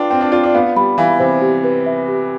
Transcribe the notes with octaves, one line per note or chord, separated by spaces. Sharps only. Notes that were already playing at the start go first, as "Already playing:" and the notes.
Already playing: D4 F4 B4 G5
C4 G5
D4
F4 D5
D4
B3 F5
G3 B5
E3 F5
C3 C5
G4
B4
E5
G4